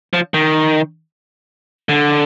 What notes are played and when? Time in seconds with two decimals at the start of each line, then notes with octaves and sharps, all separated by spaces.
0.13 F3
0.34 D#3
1.89 D3